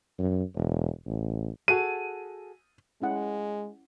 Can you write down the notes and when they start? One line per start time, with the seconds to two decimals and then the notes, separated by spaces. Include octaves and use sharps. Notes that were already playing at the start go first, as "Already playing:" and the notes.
0.19 F#2
0.56 E1
1.06 A1
1.68 F#4 G#4 A4 D#7
3.02 G#3 C#4 E4 F#5